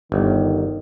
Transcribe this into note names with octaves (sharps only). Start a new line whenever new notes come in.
G1 D#3